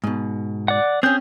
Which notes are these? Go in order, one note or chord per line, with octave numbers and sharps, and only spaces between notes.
G#2 B2
D5 F#5
C4 C#4 G#4 G6